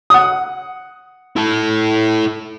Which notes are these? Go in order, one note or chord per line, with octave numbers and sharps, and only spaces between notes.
F#5 D#6
E4 A4